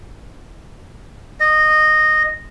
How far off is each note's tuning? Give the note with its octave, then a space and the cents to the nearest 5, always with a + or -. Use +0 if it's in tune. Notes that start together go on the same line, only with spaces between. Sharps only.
D#5 -15